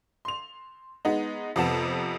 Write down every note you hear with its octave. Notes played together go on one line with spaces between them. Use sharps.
C6 F7
G#3 B3 D#4
F2 C3 B3 A5